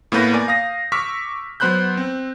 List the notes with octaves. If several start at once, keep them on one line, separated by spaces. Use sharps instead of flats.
A2 A#3 B3 B4 G6 A#6
A#4 D5 G#5
F5 D#6 A#6
C#6 D6 E6 F6 B6
F#3 B3 C5 B5 F#6 G6
C4